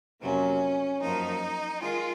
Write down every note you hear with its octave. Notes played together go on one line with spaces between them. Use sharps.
F2 C3 F#3 A#3 C#4
F#2 F3 A#3 D#4
D#3 G#3 F4